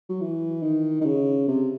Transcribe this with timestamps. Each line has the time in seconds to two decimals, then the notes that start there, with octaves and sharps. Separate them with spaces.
0.09 F#3
0.21 E3
0.63 D#3
1.01 D#3
1.05 C#3
1.48 C3